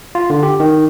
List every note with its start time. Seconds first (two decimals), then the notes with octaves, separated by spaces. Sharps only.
0.15 F4
0.30 D3
0.43 G4
0.60 D#3